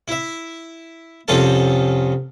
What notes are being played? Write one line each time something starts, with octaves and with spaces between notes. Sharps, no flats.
E4 E5
C2 F2 C#4 F4 A4 A5